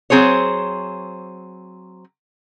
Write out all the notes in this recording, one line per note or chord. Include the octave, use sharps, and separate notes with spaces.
F#3 C4 G#4 C5 C#5